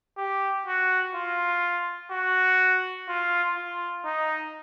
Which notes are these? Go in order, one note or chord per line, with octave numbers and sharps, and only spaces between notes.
G4
F#4
F4
F#4
F4
F4
D#4